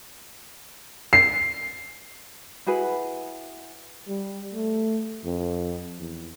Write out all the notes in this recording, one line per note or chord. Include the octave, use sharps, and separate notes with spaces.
C7
E4 F#4 G#4 B4
G3
A3
F2
E2